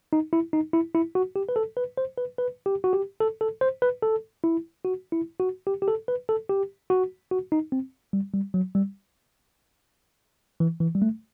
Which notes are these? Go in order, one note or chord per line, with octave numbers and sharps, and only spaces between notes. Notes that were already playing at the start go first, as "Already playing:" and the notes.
D#4
E4
D#4
E4
E4
F#4
G4
B4
A4
B4
C5
B4
B4
G4
F#4
G4
A4
A4
C5
B4
A4
E4
F#4
E4
F#4
G4
G4
A4
B4
A4
G4
F#4
F#4
D#4
C4
G3
G3
F#3
G3
E3
E3
G3
A3